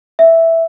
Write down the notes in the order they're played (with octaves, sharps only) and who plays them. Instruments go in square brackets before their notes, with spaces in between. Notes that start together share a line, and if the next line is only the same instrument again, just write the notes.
[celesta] E5